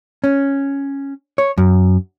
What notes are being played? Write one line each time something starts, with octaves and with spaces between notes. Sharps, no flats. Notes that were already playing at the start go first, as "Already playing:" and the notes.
C#4
C#5
F#2